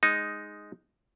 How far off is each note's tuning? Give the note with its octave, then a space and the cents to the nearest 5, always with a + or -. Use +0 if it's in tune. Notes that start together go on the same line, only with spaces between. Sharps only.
G#3 +0 D#4 +0